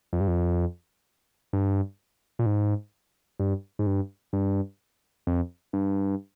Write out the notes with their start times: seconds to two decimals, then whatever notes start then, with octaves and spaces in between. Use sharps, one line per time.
0.13 F2
0.20 G2
0.28 F2
1.53 G2
2.39 A#2
2.46 G#2
3.40 G2
3.79 G#2
3.87 G2
4.33 G2
5.27 F2
5.73 G2